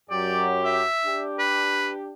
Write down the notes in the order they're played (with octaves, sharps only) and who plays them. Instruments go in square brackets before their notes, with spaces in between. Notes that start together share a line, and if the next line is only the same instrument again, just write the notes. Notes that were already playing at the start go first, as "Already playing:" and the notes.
[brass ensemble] F#2 F#3 G4 [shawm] D5
[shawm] E5
[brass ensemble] D4 G4
[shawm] B4